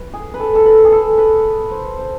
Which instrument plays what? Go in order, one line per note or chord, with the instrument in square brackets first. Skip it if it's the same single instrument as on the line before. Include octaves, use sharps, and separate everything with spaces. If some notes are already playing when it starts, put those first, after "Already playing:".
Already playing: [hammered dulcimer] B4
G#4
B4
A4
A4
B4
G#4
A4
B4
C5
C5